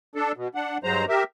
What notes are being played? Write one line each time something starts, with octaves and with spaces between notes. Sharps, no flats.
D4 A4
B2
D4 F#5
G2 F#3 G#3 C5 A#5
G4 A#4 E5